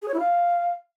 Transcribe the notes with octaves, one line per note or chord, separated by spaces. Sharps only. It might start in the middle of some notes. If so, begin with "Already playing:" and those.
G#4
C#5
E4
F5